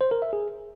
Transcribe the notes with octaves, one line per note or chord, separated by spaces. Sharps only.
C5
A#4
E5
G#4